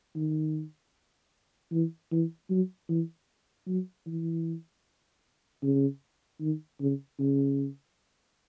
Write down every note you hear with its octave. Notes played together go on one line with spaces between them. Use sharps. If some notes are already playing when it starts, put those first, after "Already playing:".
D#3
E3
E3
F#3
E3
F#3
E3
C#3
D#3
C#3
C#3